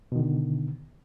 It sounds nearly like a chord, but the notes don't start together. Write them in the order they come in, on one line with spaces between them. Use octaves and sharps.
B2 D#3 D3